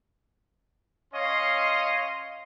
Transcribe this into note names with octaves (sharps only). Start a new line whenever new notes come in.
C#4 C#5 D#5 F5 C6